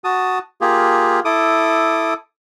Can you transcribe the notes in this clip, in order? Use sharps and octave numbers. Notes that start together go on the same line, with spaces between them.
F#4 A5 D#6
A#3 F4 G4 G#4
E4 A4 D6 D#6